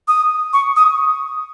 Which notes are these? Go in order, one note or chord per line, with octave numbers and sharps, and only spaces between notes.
D#6
C#6
D#6